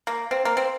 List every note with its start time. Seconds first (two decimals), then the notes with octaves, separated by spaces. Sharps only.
0.07 A#3
0.31 C4
0.45 A#3
0.57 C4